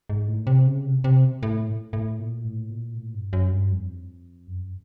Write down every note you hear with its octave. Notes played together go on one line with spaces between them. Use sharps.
G#2
A2
C3
C#3
C3
C3
A2
A2
A#2
A2
A#2
A2
G2
F#2
G2
F2
F#2